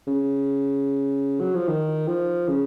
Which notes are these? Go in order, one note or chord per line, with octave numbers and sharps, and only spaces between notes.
C#3
F#3
F3
D#3
F3
C#3